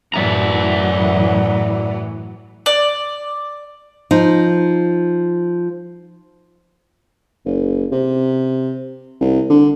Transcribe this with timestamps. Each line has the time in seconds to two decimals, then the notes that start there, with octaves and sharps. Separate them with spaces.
0.14 F#2 A2 E3 F#3 D5 E5 A#5
2.66 D5
4.11 F3 D#4
7.46 F#1
7.92 C3
9.21 C2
9.50 D3